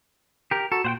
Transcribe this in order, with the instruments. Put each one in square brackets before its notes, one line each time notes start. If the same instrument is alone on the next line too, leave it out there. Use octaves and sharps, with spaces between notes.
[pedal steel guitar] G4 A#4
[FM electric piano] F#4 A#5 C#6 [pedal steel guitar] A4
[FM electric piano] A#2 [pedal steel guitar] C5 F#5 G5